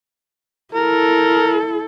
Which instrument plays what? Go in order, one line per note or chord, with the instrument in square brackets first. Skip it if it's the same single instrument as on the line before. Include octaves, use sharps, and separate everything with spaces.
[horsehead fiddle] E4 A4 [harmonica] A#4